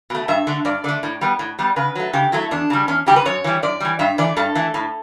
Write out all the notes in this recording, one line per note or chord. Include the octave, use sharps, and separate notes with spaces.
B2 A3
G2 E5
D3 A3
G2 D5
D3 A3 D5
A2
G3 B3
A2
G3 B3
C#3 B4
F#3 A3
C#3 G4
F#3 A3 E4
E2 D4
C#3 G3
E2 C#4
C#3 G3 G4
B4
F#2 C#5
E3 G3
F#2 D5
E3 G3
G2 E5
E3 A3 D5
G2 A4
E3 A3
A2